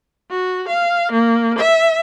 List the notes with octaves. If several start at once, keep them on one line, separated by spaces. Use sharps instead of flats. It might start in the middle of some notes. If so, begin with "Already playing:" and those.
F#4
F5
A#3
E5